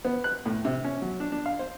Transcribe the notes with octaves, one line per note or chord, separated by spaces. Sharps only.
B3
F#6
A2
C3
C#4
F#3
D4
D4
F5
C5